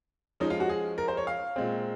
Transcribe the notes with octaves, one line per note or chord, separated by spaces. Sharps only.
F3 G#3 C#4 D#4
F4
F#4
G#4
A#4
C5
C#5
F5
A#2 G#3 C4